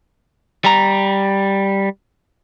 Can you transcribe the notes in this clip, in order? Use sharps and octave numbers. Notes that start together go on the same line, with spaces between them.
G3 A#5